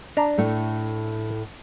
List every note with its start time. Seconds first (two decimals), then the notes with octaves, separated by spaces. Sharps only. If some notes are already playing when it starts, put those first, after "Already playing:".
0.17 D4 A#5
0.38 A2 A3